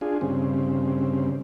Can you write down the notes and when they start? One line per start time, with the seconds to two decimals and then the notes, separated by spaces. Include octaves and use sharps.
0.01 D4 F4 G#4
0.21 G2 C#3 C4